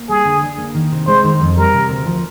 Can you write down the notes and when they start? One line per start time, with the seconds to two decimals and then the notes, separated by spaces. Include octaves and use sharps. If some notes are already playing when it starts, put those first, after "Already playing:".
Already playing: A#3
0.09 G3 G#4
0.25 D3
0.43 D4
0.58 A#3
0.75 D#3
0.92 C3
1.07 G#3 C5
1.24 D#3
1.41 F2
1.57 G3 A#4
1.74 C3
1.89 D2
2.06 F3